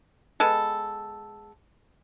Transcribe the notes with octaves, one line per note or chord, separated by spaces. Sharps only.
G#3 B3 A4